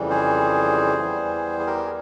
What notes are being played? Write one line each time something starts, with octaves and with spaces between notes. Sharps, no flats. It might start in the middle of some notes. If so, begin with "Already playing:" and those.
Already playing: F2 C#3 E3 G3
G#4 C5
E2 E3 G3
G#4
G4 A#4
G#4